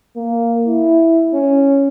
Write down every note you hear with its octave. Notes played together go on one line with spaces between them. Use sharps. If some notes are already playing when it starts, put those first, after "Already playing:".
A#3
E4
C#4